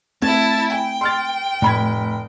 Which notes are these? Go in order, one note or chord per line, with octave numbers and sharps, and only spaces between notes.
A3 C4 E4 A5 G#6
G5 G#5
C6 F6 A6
F1 A2 B5 G#6